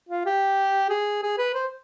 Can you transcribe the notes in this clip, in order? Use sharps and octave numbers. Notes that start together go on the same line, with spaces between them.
F4
G4
G#4
G#4
B4
C5